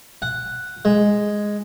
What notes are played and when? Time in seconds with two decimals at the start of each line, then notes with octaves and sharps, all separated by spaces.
0.22 F#5
0.85 G#3